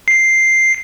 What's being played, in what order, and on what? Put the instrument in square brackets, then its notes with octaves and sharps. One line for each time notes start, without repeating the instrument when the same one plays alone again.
[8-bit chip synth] C7